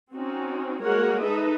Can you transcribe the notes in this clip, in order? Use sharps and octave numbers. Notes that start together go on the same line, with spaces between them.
C4 C#4 D#4 F#4
G#3 A#3 F#4 A#4 C#5 F#5
D#4 A4 B4 D#5 E5